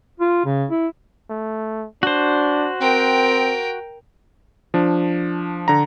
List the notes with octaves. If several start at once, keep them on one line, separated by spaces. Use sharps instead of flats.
F4
C#3
E4
A3
D4 F#4 C5
C4 A#4 G5
F3 D4
D3 A#5